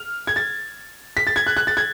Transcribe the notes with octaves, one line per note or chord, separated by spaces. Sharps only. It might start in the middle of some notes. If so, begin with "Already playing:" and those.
Already playing: F6
G#6
A6
B6
A6
G#6
F#6
F#6
A6
G#6